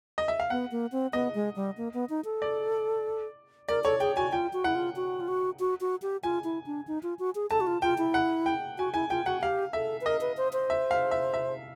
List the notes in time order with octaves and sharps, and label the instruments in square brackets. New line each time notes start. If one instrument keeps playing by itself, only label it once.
[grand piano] D#5
E5
F5
[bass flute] B3 [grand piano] F#5
[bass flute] A#3
C4
[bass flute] B3 [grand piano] D#5
[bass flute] G#3
G3
A#3
B3
D#4
A4
[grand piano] D5
[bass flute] A#4 [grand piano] D5
[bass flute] A4 [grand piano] C#5
[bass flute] G#4 [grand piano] G5
[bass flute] F#4 [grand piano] G#5
[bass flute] F4 [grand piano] G5
[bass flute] F#4
[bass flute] E4 [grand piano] F#5
[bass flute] F4
F#4
F4
F#4
F#4
F#4
G4
[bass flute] F4 [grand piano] G#5
[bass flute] E4
D4
D#4
F4
F#4
G#4
[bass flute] A4 [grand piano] A5
[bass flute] F#4
F4
[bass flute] F4 [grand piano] G5
[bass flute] E4
[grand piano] F#5
G5
[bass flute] F#4 [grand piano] G#5
[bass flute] E4 [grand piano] G#5
[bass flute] F4 [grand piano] G5
[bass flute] F#4 [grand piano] F#5
[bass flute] G4 [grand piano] F5
[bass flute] A4 [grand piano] E5
[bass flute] B4
[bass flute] A#4 [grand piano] D#5
[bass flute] B4
C5
C5
[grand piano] E5
F5
E5
E5